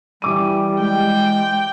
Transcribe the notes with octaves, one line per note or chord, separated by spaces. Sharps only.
E3 G3 D6 D#7
G#3 G5